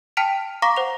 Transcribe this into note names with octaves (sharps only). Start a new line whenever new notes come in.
G5 A5 F6 B6 D7 F7
F5 A#5 C#6 D6 A#6
C5 F#5 F7